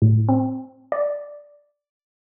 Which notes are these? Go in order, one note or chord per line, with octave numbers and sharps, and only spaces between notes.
A2
C4
D5